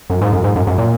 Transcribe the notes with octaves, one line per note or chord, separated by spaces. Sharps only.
F#2
G#2
F#2
G#2
F#2
F#2
A#2